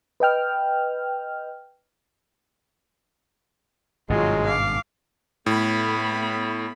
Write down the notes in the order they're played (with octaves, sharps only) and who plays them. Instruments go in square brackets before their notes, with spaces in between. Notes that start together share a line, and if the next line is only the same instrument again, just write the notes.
[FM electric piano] B4 D#5 G5 F6
[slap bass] G#1 G2 B2 [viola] F#3 F4 [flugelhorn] G#3
[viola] F5 D6
[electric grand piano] A2 [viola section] A3 B3 B5